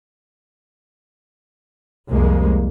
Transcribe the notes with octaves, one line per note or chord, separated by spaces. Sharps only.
C2 F2 G#3 A#3